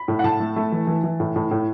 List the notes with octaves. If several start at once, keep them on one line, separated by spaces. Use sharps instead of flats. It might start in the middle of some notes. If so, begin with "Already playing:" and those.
Already playing: B5
A2
F#5
A2 A5
A3
A3
E3
E3
E3
A2
A2
A2